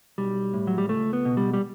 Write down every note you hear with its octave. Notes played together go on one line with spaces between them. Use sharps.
B1 G3
A2
F#3
G3
C#2 A3
B3
B2
G3
G3